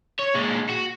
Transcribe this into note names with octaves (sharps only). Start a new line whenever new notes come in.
C#5
A#2 G#3
F#4